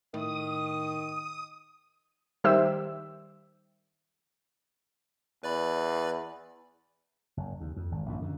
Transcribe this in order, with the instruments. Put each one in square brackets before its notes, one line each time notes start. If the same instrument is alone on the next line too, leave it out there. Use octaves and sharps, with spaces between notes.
[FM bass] A2 [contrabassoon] D#3 [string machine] D#6
[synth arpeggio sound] D#3 G3 G4 C5 E5 E6
[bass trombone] E2 [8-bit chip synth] B4 D5 B5
[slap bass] F#1
D#2
F2
G#1
A#1 F#2 A2
F#2 D3